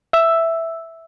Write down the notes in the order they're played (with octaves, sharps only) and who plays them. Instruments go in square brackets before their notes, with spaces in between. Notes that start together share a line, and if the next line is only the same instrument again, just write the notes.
[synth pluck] E5 E6